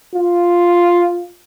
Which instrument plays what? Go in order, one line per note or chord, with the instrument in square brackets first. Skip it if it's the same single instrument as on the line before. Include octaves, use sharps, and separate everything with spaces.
[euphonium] F4